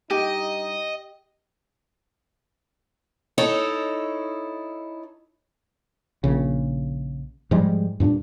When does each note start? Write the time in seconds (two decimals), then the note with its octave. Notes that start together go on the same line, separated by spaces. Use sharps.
0.11 G2 D#4 G4 D#5
3.38 D#4 E4 A4 C#5
6.24 A#1 C#3
7.51 G#2 F3 G3 G#3
8.00 G2 A#2 B3 D4